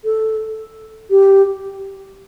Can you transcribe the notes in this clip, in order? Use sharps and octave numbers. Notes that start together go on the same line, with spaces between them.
A4
G4